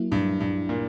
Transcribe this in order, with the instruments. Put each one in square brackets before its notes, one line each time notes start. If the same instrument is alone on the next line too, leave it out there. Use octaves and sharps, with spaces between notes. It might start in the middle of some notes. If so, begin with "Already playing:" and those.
Already playing: [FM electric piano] F#3 A#3 E4
[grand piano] G2
G2
A#2